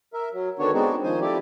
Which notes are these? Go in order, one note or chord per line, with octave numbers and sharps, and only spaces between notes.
A#4 E5
F#3
D3 D#3 B3 D4 F#4 C#5
G#3 B3 C4 D4 D#4 F#4
D#3 F3 D#4 C5 G#5
F3 A3 C4 E4 G4 D5